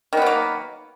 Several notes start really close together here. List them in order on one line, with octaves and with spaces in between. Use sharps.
D#3 B3 F#3 A#3